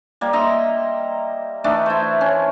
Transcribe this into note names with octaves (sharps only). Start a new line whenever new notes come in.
G3 A#3
D#5 E5 A#5 C6
E3 A3 D4 D#4
E4 C5
C#4